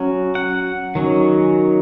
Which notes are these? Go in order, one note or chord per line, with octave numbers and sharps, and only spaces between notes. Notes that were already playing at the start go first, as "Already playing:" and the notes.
Already playing: F#3 C#4
F#5
D#3 F#3 C#4